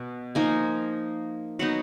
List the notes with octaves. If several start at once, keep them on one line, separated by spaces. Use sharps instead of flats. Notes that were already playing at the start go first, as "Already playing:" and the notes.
Already playing: B2
F3 A#3 D#4 G#5
F#3 B3 D#4 F#5